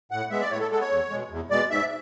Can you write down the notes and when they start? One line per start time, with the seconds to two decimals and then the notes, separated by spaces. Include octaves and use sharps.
0.11 A2 F#5
0.30 G#3 B3 E5
0.41 D5
0.51 A2 C#5
0.60 A4
0.71 G#3 B3 A4
0.81 C#5
0.90 E2
1.10 B2 G#3
1.30 E2
1.50 B2 G#3 D5
1.70 G#2 E5